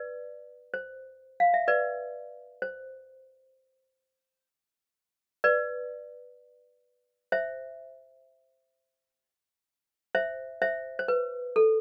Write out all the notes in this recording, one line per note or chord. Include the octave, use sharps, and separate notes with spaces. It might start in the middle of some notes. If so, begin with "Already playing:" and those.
Already playing: B4 D5
C5
F5
E5
B4 D5
C5
B4 D5
C5 E5
C5 E5
C5 E5
C5
B4
A4